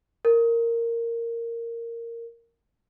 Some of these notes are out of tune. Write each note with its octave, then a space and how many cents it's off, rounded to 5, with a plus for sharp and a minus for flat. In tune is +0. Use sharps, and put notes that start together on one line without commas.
A#4 -10